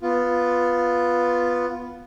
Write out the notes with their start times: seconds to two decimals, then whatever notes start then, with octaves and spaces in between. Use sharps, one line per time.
0.02 B3 F4